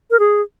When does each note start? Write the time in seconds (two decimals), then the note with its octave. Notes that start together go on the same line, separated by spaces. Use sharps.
0.11 A#4
0.19 G#4